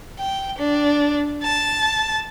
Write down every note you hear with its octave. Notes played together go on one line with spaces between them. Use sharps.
G5
D4
A5